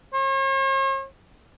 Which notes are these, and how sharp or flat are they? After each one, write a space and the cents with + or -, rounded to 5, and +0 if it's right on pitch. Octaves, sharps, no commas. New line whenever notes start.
C#5 -45